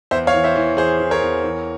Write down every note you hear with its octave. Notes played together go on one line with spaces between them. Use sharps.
E2 C5 E5
C#5 F5
E3
C5 E5
E3
E2 G#4 C5
E3
A#4 C#5
E2
E3